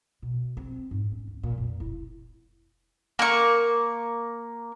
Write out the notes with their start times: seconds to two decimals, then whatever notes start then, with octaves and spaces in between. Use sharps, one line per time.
0.22 B2
0.57 C4
0.91 G#2
1.12 C#4
1.27 D2
1.43 A#2
1.58 F1
1.80 E4
3.19 A#3 C#6